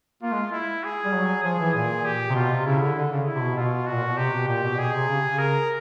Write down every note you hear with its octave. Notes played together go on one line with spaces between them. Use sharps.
A#3 F4
G#3
E4
G#4
G3
F#3
F3 G#4
E3
A#2 G#4
G4
C3
B2 F4
C3
C#3 E4
D3
D3
C#3
E4
C3
B2
B2 F4
A#2 F#4
B2
C3 G4
B2
A#2 G4
B2
B2 G#4
C3
C#3
C#3
A#4